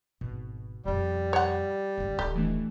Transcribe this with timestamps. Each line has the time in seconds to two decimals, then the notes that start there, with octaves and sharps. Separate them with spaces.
0.21 G#1 B2
0.85 F2 A2 G3
1.33 C#5 F#5
1.98 G1 C#2
2.19 D1 D#3 G4 A4 D#5
2.35 E3 A3 D4